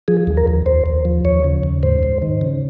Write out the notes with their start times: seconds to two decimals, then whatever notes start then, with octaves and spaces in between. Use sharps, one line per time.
0.08 F3 G#4
0.27 D#2
0.37 A#4
0.47 D#2
0.66 D#2 C5
0.86 D#2
1.05 F3
1.25 D#2 C#5
1.44 C#3
1.63 D#2
1.83 G#2 C5
2.03 G#2
2.22 D#3
2.41 C#3